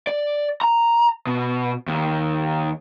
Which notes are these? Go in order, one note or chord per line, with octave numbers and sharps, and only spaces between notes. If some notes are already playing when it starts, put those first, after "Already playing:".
D5
A#5
B2
D#2